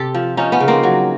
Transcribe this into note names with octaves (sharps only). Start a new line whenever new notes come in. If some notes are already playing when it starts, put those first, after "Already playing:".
Already playing: C3 G4 A4
F3
F3 C#4 D#4
B3 C#4
C#3
A#3 C4
F#3